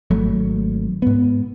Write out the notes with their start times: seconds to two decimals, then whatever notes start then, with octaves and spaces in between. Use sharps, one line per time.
0.11 G#1 F#3 A3
1.02 G#2 B3